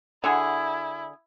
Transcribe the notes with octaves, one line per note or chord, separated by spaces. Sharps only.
D3 E4 F#4 G#4